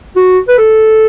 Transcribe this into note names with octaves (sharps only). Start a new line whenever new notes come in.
F#4
B4
A4